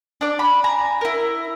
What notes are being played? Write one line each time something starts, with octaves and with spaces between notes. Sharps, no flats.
D4 D5
B5
G#5 A#5
E4 A#4